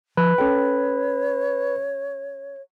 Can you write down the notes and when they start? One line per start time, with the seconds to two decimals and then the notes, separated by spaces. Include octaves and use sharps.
0.17 F3 B4
0.38 C#4 A4 C#5 G5